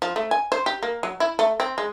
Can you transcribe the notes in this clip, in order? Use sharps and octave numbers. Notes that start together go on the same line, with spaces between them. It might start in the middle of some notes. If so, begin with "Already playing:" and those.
F3
A3
G#5
C5
G4
A#3
F#3
E4
A3
C4
G#3